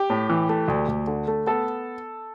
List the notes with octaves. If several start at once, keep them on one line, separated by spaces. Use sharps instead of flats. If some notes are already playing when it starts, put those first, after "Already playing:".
Already playing: G4
A2
E3
A3
D2
D2
D3
A3
B3 A4